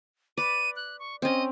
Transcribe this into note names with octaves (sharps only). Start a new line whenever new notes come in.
B4 D5 D#7
F#6
C#6
C4 C#4 D#5